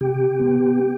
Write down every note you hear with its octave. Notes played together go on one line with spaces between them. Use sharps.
C3 G4 G5
B3